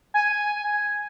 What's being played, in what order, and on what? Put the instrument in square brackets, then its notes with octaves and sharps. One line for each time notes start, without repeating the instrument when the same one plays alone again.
[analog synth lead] G#5